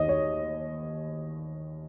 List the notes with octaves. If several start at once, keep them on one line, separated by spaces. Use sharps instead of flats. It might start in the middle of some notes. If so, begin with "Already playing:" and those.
Already playing: D#2 D#3 D#5
C#5